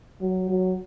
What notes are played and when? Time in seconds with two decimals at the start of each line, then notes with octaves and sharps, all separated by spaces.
0.21 F#3
0.49 F#3